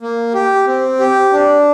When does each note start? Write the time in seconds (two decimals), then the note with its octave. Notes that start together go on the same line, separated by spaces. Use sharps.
0.01 A#3
0.34 G4
0.67 C4
0.99 G4
1.33 D4